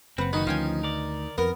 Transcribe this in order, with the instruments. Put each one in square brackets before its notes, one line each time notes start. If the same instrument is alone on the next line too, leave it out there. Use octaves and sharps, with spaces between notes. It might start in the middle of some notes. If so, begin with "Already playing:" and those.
[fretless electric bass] F#1 [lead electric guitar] C4 [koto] B4 F#5
[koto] D#3 [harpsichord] D#4 [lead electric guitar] F#4 B4
[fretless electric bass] D2 [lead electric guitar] F3 C#4 [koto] F5 G5 G#5
[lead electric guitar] A#4 D5
[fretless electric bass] F2 [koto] B3 [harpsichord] A#4